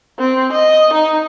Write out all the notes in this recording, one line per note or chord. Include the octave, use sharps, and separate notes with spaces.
C4
D#5
D#4